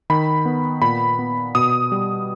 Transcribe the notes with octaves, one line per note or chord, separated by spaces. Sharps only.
D#3 B5
B3
A#2 B5
B3
B2 D#6
G3